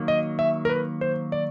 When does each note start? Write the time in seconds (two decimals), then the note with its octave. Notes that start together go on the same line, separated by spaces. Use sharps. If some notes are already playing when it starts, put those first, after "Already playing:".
Already playing: D#3 F#3 A#3
0.08 D#5
0.39 E5
0.65 A#4
0.69 B4
1.01 C5
1.32 D5